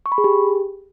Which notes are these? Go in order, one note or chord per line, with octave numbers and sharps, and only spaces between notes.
C#6
B5
G#4
G4